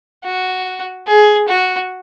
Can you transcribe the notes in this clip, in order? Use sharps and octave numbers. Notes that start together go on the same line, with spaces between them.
F#4
G#4
F#4